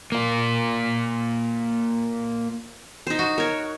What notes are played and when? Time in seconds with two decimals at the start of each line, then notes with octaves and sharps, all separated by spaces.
0.12 A#3 F4
3.07 D#4 C5
3.19 F#4
3.38 A#4 C#5